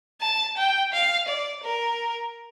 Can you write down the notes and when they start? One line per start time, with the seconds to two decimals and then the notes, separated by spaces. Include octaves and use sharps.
0.21 A5
0.57 G5
0.92 F5
1.28 D5
1.63 A#4